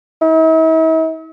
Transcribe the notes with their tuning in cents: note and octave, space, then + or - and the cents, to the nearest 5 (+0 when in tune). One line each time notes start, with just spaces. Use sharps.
E4 -45